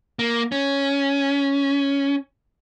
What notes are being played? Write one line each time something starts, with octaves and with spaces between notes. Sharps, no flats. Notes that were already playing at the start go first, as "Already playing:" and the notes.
A#3
C#4